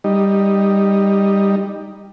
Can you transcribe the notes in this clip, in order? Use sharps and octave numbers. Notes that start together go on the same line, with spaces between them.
G3 D#4